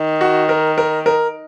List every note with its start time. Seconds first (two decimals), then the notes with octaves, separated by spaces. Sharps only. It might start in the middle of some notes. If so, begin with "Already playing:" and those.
Already playing: D#3
0.21 F#4
0.49 A#4
0.78 A#4
1.06 A#4